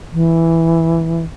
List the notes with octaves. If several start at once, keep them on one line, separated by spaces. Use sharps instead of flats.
E3